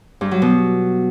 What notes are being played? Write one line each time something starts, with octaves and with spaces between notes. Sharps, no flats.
G2
F#3
B2